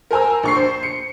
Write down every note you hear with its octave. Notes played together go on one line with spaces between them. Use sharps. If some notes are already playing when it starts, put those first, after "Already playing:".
A#4 C5 G#5 A#5 E6
A#1 C#6 C7
C5
C#7